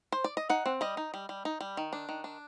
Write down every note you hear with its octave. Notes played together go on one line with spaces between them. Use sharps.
C5
D5
D#5
D#4 F#5
C4
G3 D#5
D#4
G3
G3
D#4
G3
D#3
D4
D#3
D4